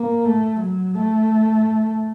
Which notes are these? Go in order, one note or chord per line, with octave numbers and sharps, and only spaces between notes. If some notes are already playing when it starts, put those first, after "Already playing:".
Already playing: A#3
A3
F#3
A3